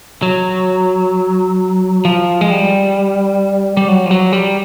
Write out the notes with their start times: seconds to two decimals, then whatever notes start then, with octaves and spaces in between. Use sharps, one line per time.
0.22 F#3
2.05 F3
2.41 G#3
2.51 G3
3.77 G3
3.88 F#3
4.06 F3
4.11 F#3
4.33 G3